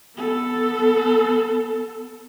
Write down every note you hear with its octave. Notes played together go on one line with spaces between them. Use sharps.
B3 A4